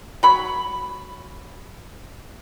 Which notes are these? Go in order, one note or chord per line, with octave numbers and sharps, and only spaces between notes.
F#3 B5